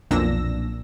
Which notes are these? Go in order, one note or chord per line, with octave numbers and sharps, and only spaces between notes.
B1 F2 A#2 D4 E6 A#6